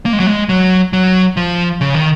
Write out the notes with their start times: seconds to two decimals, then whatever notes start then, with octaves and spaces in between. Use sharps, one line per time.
0.06 A#3
0.13 G#3
0.20 F#3
0.27 G#3
0.49 F#3
0.93 F#3
1.37 F3
1.81 C#3
1.94 D#3